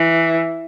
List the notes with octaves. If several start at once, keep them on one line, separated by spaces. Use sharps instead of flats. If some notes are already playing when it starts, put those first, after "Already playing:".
Already playing: E3